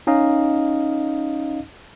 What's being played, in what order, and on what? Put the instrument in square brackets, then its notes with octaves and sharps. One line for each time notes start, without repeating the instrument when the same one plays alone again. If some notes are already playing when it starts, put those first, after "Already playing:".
[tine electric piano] C#4 D#4 D#5 F5